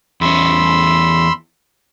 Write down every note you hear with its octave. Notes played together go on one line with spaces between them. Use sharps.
E2 C#4 B5 C6 E6